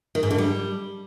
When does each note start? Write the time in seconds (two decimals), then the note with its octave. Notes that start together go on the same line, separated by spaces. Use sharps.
0.15 D#3
0.23 G#2
0.31 D3
0.38 G3